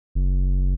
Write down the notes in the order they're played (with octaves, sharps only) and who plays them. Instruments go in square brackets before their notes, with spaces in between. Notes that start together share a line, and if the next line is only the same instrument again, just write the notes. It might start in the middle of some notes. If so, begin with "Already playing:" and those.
[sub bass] F#1